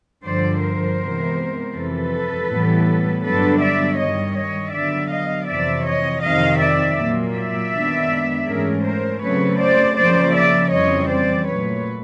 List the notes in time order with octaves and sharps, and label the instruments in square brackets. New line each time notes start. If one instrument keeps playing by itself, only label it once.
[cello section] G2 D3 F3 C5 D5
A#4 C5
C3 E3 G#3 B3
F2 C3 E3 A4 B4
A2 E3 G3 B3
G2 D3 F#3 B3 D4 A4 B4
D5 E5
G2 D#3 G3 C#5 D#5
C#5 D#5
D3 F#3 B3 D5 E5
D#5 F5
F2 C3 E3 D5 E5
C#5 D#5
F2 C3 D#3 D#5 F5
D5 E5
A#2 F#3 A#3
D5 E5
F#2 D#3 G#3 B3 D4
G#2 E3 A3 C#4 G#4 A#4
A#4 C5
C#3 F#3 A3 C4 B4 C#5
C5 D5
C#3 F3 A#3 C5 D5
D5 E5
F2 C#3 E3 G3 C4 C#5 D#5
C5 D5
A#2 F#3 A3 B4 C#5